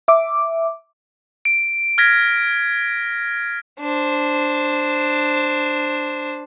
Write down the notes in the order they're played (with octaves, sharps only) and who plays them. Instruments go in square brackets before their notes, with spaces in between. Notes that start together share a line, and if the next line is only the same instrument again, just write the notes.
[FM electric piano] E5 D6
[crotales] D7
F6 G#6 A#6 B6
[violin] D4 C5